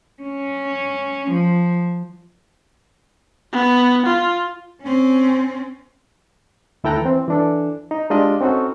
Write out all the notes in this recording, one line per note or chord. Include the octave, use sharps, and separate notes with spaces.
C#4
F3
B3
F4
C4 C#4
D2 E4 A4 G5 A#5 F#6
E3 C4
E3 D4 A4
D#4
G#3 D4 F4 G4 D5 D#5
C4 C#4 D#4 F#4 A4